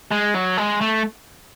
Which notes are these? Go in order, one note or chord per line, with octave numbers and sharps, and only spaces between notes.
G#3
F#3
G#3
A3